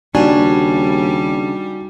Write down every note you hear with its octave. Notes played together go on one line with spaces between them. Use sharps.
D#2 C#3 G3 D4 D#4 F#4 G#5